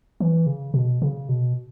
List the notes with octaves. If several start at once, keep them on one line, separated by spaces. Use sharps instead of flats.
E3
C#3
B2
C#3
B2